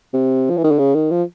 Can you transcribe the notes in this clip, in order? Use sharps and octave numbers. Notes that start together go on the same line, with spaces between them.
C3
F3
E3
D#3
D3
C#3
D#3
F3